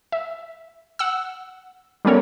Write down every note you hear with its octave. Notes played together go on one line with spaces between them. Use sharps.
E5
F#5 E6
G3 A3 B3 C#4 A#4 C#5